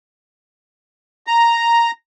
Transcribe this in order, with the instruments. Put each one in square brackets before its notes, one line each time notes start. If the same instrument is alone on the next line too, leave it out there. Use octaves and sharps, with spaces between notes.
[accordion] A#5